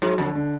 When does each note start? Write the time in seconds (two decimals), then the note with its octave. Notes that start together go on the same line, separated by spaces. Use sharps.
0.02 G#2 F#3
0.18 F2 D3
0.35 D3